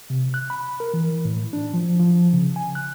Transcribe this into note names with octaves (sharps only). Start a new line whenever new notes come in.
C3
F#6
B5
A#4
E3
A2
D4
F3
F3
C#3
G#5
F#6